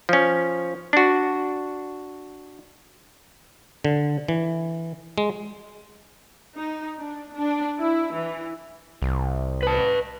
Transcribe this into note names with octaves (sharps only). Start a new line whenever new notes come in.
F3 C#4
D4 F#4
D3
E3
G#3
D#4
D4
D4
E4
E3
C2
B4 A5